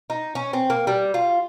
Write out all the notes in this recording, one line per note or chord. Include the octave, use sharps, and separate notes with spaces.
D#4
C#4
C4
A#3
G3
F4